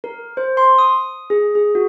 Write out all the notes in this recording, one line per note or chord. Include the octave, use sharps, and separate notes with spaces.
A#4
C5
C6
D#6
G#4
G#4
F#4